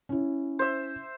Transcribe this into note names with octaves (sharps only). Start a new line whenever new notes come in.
C#4 E4
C5 E5